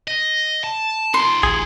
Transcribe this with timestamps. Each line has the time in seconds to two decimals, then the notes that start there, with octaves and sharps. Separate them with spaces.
0.08 D#5
0.64 A5
1.14 D#4 F4 C6
1.43 A1 G#4